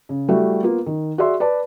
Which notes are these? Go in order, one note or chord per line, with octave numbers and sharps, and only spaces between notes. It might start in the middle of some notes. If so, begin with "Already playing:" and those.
C#3
G3 A3 E4 F#4
A#3 B3 F4
D#3
F#4 G#4 D5 E5 C6
B4 D5 A5